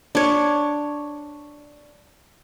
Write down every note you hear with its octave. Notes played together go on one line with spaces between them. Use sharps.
D4 C#5